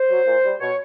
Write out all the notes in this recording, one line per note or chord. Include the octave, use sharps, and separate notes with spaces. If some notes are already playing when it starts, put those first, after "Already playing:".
Already playing: C5
F#3
A#2
G3
B2 C#5